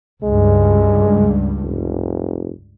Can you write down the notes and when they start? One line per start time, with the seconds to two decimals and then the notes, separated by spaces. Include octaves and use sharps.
0.24 C#2 G2 G#3
1.63 F1